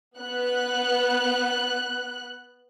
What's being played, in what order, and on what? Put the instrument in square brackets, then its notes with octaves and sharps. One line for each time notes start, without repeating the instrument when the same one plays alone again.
[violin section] B3 F#6